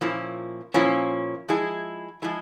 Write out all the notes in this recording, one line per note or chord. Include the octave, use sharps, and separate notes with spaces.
A#2 F3 A#3 C#4 E4
A#2 F3 A#3 C#4 E4
F3 G#3 E4 G#4
F3 G#3 E4 G#4